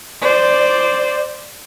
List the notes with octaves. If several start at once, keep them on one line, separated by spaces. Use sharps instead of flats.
C5 D5